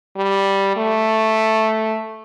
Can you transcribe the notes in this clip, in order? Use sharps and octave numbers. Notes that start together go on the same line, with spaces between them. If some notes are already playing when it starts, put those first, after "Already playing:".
G3
A3